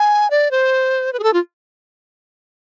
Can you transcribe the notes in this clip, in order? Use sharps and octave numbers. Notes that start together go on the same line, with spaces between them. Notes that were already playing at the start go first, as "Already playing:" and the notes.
Already playing: G#5
D5
C5
B4
G#4
A4
F4